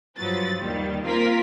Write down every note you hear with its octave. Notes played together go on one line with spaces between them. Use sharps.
G2 F3 F#3 B4 A6
D#2 D#3 G3
A#3 C4 F4 A#4 B6